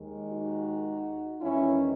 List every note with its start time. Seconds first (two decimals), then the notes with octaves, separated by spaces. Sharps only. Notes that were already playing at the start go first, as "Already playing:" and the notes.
Already playing: D#2 D#3 G#3
0.28 D#4 F#4
1.40 E2 D#3 G#3 C#4 E4